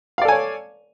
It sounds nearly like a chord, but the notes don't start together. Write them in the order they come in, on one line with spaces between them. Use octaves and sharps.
F5 D5 A4 G#5 C#5